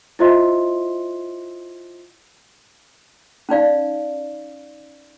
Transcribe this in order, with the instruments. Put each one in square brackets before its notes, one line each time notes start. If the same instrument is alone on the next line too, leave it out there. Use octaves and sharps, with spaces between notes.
[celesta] E4 F4 C5 D#5 E5 C6
[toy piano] C#4 D#4 D5 F5